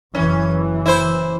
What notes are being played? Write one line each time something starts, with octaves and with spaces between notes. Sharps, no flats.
F#1 E3 C#4
E4 C5